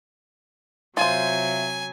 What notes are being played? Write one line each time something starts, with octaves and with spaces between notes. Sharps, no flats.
C3 F#3 F4 C5 E5 G#5